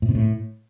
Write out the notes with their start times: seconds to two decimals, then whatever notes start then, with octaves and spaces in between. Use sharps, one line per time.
0.02 A2
0.09 C3
0.15 A2